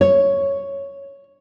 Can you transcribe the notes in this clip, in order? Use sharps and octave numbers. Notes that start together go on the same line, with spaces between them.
C#5